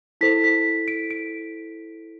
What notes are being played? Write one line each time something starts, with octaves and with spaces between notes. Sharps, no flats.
E4 A4 C5 B6
B6
D7
D7